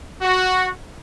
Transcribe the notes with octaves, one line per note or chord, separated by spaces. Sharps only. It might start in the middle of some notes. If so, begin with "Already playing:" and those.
F#4